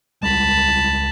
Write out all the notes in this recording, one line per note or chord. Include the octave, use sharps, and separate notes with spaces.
C#2 G3 G#3 A5 B5